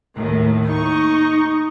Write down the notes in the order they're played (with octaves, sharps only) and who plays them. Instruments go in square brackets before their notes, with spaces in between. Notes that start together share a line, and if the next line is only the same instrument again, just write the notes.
[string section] D#2 A2 D#3
[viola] D#4 [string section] C#6